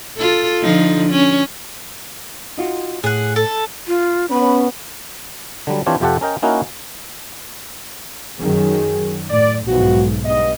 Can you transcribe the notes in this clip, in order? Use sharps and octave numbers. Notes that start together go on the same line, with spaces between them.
F4 A4
D3 F3 D#4
C#4
D#4 F4 F#4
A2 G#4 F#5
A4
F4
B3 C#4 B5
D3 F#3 G3
E3 C4 D4 F4 G4 C#5
F2 C3 F4 G4 A4 F#5
C#4 A#4 D#5 G5
A#3 C#4 D#4 E4 F#4 A#4
F#2 D#3 F#3 G#4
A2 D5
B1 G#2 E3 F3 F#4
G2 B3 D#5